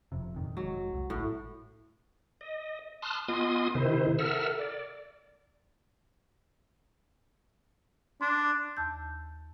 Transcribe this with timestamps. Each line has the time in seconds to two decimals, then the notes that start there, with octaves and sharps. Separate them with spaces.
0.12 F1 F2 C3
0.36 F2 A#2 D#3
0.57 F1 F#3 G#3
0.93 C2
1.10 G#1 A2
2.41 D#5
3.02 A5 C6 D#6 F6 F#6
3.28 B3 F4 D#5 G#5 C6 D#6
3.75 C3 D#3 E4 C5
4.19 A4 A#4 E5 F#5 E6 F6
4.59 D5
8.21 D4 C6
8.77 D#2 A5 E6 G6